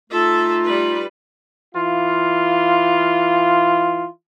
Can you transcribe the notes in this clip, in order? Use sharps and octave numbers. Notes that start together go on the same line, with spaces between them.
A3 D#4 F4 A4 E5
G3 B4
E3 F4